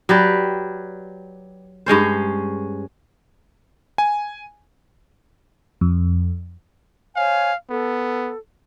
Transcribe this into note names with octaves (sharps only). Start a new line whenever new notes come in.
F#3 G4 B4 D5
G2 G#3 C#4 C5
G#5
F2
C5 C#5 F5 G#5
B3 A4